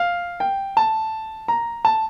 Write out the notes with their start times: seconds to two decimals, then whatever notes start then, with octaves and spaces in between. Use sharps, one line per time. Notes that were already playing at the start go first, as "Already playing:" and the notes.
Already playing: F5
0.40 G5
0.77 A5
1.48 A#5
1.85 A5